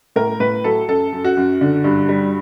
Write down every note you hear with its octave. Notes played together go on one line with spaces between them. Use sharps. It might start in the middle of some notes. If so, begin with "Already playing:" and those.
A2 A#4
A2 B4
F#3 A4
F#2 A4
F#2
F#4
F#2
D3
G2
G3